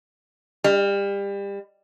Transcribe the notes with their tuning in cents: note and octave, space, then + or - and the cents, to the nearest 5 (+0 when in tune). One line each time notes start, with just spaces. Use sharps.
G3 +30